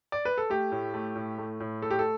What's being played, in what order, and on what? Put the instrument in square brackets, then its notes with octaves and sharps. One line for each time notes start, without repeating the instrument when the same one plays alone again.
[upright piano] D5
B4
A4
A3 G4
A2
A3
A2
A3
A2
A3 A4
G4
A4